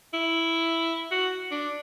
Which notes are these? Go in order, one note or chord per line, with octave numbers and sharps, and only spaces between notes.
E4
F#4
D4